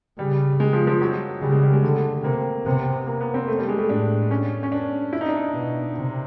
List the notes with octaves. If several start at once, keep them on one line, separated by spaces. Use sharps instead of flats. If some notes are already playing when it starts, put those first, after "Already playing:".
C#3 G3
G#3
F3
F3
F#3
C#3 G3
G#3
G3
G#3
D3 A3
C3 A#3
C3 B3
A#3
B3
C4
A3
G3
G#3
A3
A2 D4
C#4
C#4
D4
E4
D#4
D4
D#4
B2
C3